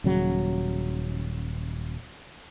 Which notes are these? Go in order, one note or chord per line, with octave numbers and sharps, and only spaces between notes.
D#1 C#3 F#3